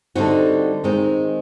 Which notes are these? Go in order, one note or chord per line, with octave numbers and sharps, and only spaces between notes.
D3 G3 C4 D#4 F#4
D#3 G#3 C4 D#4